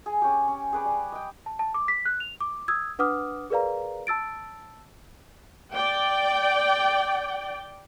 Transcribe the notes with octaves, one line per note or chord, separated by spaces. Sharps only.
G#4
C#4 G4
C#4
G#4 B4 D5
G3
D#5 G5
A5
A5
D6
B6
F#6
F7
D6
D#6 E6 G#6
D4 B4 F#5 D6 D#6 F6
G#4 A#4 B4 D5 F5 A#5
A5 E6 A6 D7
D5 G5